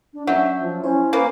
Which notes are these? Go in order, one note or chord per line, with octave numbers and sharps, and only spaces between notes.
D4
F#3 C#4 D4 E5 G6
F3
C#4 E4 C5 C#5
A#3 B4 C5